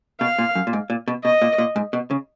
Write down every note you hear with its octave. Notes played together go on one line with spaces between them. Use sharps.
B2 F5
A#2
F#2
A#2
G#2
A#2
B2
B2 D#5
A#2
A#2
G#2
B2
C#3